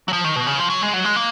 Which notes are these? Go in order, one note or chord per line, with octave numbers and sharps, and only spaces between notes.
F#3
F3
D#3
B2
C#3
F3
F#3
G#3
F#3
G#3
A#3